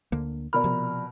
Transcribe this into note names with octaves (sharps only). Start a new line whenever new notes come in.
D2 D3 A#3
B2 A#4 D5 B5 F6
C3 F3